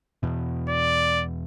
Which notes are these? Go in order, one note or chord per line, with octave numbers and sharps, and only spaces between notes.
E2 B2
D5